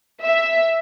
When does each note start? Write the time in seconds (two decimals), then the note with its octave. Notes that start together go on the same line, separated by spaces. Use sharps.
0.22 E5